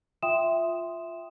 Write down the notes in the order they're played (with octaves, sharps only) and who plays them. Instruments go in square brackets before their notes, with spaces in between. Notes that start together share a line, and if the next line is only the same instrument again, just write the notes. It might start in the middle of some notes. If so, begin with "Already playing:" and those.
[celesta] F4 E5 G5 C6 D#6 E7